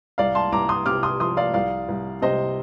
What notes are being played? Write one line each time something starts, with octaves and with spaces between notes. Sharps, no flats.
C2 D5 F5
A5 C6
C2 A#5 D6
C6 D#6
C3 D6 F6
C6 D#6
F3 C6 D#6
D5 F5
C2 D5 F5
C2
C3 C5 D#5